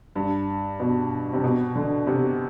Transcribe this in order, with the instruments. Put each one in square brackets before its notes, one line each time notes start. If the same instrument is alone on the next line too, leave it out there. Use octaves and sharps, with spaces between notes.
[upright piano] G2
B2
C3
B2
D3
C3